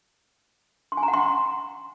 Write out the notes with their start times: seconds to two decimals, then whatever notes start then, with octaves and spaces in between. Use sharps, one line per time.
0.92 C6
0.97 G#5
1.03 A#5
1.08 F#5
1.14 C6